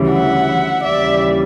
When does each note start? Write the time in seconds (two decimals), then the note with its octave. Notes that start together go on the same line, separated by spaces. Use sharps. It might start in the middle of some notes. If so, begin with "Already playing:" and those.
Already playing: D2 C#3 E3 G3
0.09 E5 F#5
0.84 D#2 C#3 E3 G3 D5 E5